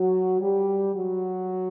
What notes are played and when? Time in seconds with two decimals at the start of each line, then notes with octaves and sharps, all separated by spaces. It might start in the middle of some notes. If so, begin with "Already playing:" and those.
Already playing: F#3 F#4
0.41 G3 G4
0.94 F#3 F#4